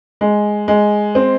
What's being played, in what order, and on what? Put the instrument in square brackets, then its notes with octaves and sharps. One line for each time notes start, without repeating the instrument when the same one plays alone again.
[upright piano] G#3
G#3
C4